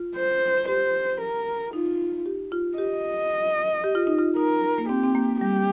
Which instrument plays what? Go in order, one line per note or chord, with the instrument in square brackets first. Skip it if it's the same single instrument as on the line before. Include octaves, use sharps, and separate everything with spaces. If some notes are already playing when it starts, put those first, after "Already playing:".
Already playing: [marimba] F4
[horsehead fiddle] C5
[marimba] G4 [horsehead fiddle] C5
[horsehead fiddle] A#4
[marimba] D#4 [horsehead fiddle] F4
[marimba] G4
F4
[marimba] G4 [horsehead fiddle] D#5
[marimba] G4
F4
D#4
F4
[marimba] D#4 [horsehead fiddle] A#4
[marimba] A#3
[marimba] C4 [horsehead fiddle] G4
[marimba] C4
A#3
[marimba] G3 [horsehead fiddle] G4